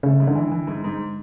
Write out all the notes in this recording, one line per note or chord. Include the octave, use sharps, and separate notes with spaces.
C#3 A3
G#2
D3
E3
E3
G#2
G#2